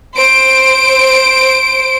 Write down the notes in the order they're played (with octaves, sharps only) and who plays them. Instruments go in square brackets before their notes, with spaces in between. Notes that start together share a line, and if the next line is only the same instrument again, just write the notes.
[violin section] C5 D7